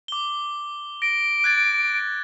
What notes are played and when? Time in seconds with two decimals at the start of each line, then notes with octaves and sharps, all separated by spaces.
0.08 D6 G7
1.02 A#6 D7
1.44 F#6 G#6 A6